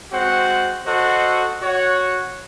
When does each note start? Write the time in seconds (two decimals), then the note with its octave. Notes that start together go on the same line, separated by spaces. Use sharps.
0.12 G#3 C4 F#4 C5 F#5
0.86 F#4 A4 C5 D#5 F#5
1.60 F#4 C#5 F#5